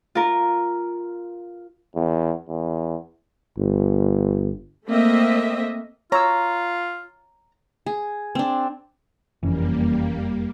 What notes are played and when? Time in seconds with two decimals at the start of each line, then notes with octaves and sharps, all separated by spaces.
0.15 F4 A#4
1.96 E2
2.48 E2
3.58 G1
4.88 A3 A#3 C4 D#5 E5
6.12 F4 C#5 A#5 E6
7.86 G#4
8.35 C4 D4
9.43 F#1 F2 E3 G3 A#3 C#4